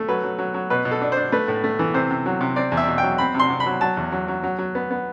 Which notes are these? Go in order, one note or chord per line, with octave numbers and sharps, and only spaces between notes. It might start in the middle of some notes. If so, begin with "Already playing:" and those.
Already playing: A3
F#3 B4
F#3
F#3
F#3
B2 B4
B2
A4
D4
D4 C5
A3 B4
A2
A3
E3
C3 C5
C3
F#3
C3
C4 D5
E2
E5
B2
G5
F#3
C4 B5
C3
C6
C3
B5
F#3
F#3 A5
E2
F#3
F#3
F#3
F#3
B3
B3